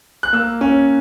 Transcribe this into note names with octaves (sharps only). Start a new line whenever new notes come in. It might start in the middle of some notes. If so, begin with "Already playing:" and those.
F#6
A#3 E6
C#4